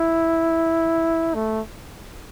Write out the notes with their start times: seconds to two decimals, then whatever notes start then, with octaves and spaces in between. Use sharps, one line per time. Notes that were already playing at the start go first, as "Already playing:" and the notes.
Already playing: E4
1.35 A3